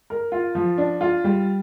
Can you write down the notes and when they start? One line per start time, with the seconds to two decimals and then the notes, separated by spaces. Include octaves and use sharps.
0.10 A#4
0.32 F4
0.55 F3
0.78 D4
1.01 F4
1.24 G3